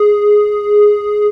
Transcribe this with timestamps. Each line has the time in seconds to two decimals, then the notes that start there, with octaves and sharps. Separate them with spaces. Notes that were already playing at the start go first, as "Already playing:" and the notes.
Already playing: G#4